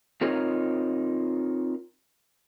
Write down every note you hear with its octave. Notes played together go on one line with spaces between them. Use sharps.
C4 D#4 F4 A#4 C5 C#5